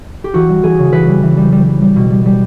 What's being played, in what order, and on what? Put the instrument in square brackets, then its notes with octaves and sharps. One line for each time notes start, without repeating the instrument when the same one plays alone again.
[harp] G4
E3 F#4
G3
E3 G#4
C#3
E3 B4
G3
E3
G3
G3
G3
G3
B2
G3
G3